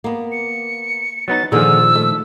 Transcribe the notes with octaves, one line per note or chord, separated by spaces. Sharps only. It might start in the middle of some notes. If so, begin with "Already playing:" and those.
A#3 B3
C#7
F#3 B3 D#4 A6
A#2 D3 D#3 F3 G#4 E6
A3